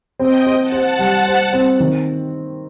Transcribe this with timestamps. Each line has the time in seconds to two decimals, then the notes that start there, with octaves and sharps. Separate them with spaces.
0.19 C4 D#5 G5
0.47 C5
0.60 F#5 A5
0.72 C5
0.99 G3
1.27 C5
1.53 C4
1.80 D#3